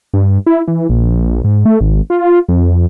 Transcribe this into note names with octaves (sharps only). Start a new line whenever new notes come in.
G2
E4
E3
A#1
G#2
A3
G#1
F4
F2